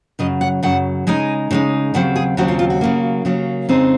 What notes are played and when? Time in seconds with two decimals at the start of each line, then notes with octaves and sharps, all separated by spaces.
0.19 F#2 C#3 F#3 D#5
0.41 F#5
0.63 F#2 C#3 F#3 F#5
1.07 C#3 G#3 D#4 G#5
1.51 C#3 G#3 D#4
1.94 D#2 C#3 F#3 C4 F#5
2.16 G#4
2.37 D#2 C#3 F#3 C4 F#4
2.48 F4
2.59 F4
2.70 F#4
2.81 C#3 F#3 A#3
3.25 C#3 F#3 A#3
3.69 F2 C#3 G#3 C4 D#4